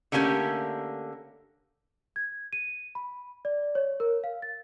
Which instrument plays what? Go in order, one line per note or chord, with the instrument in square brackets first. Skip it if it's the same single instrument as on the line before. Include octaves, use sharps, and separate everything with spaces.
[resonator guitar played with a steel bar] D3 A3 A#3 C#4 G4
[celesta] G#6
D#7
B5
D5
C#5
A#4
F5
A6